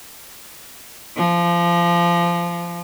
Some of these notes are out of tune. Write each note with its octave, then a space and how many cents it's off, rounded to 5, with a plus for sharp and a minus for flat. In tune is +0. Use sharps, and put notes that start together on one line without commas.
F3 -20